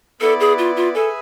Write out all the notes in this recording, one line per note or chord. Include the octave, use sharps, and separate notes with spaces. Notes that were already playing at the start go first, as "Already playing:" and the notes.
B3 E4 A4 B4 D5
G#4
F4
F4
G#4 A4 B4 E5 G#5